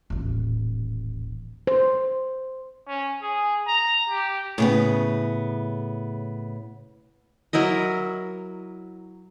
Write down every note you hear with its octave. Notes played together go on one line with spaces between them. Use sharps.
D#1 A1
C5
C#4
G#4
A#5
G4
A2 C#3 B3
F#3 E4 A#4 D#5